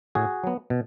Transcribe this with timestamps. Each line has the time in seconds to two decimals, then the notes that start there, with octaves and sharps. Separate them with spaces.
0.15 A2 F#4 G#4
0.44 F#3 B3
0.70 B2